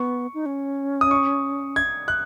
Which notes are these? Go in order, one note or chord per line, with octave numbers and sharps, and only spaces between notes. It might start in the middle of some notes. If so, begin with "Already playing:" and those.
Already playing: B3 C#6
D#4
C#4
D#6
C#6
G#6
F#6